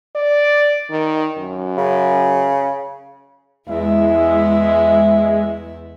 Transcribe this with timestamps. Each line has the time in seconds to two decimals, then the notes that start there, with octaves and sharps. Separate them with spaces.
0.16 D5
0.91 D#3
1.38 F#2
1.78 C#3
3.69 E2 G#3 E4 E5